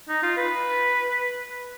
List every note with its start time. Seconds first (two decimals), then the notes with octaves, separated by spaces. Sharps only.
0.09 D#4
0.23 F4
0.37 B4